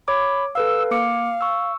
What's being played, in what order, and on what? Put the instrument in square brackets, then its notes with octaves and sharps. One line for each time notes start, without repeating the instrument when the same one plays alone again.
[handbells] C#5 D6 [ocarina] B5
[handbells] A4 B4 F5 [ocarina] E6
[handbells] A#3 D6 C#7 [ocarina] F5
[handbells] C#6 E6